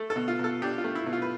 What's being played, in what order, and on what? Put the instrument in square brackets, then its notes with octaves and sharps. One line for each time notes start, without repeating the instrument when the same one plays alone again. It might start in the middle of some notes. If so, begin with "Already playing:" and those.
Already playing: [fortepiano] A3 A4
A4
B2
F4
B2 A4
D4 G4
F4
A3
E4
B2
F4
B4